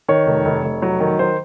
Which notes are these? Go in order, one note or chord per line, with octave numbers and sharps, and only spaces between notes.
D#3 C#5
F1
F1
F1
F#3
D#3
D#3 C5